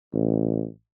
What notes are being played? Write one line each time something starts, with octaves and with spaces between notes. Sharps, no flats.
A1